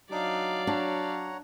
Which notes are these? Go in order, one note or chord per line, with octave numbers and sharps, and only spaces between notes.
F#3 D4 D#4 D5 F5 D6
D4 C#5 F#5 A#5